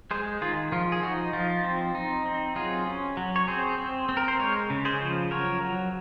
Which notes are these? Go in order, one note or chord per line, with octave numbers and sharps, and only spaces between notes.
G#3 G#4 C5
D#3 F4 G#4
F3 F4
G#4
D#4 F#4
F3 F4
C4
D#4
C4
F#3 F4 G#4
C#4
F#3
C#5
C4 G#4 C5
C4
C4
A#4
C5
G#3 A#4 C#5
C#3
G#4 C5
F3
F#3 A#4 C#5
F#3